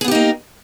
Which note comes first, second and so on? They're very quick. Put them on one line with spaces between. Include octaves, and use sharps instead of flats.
G#4 B3 G4 D#4 A#3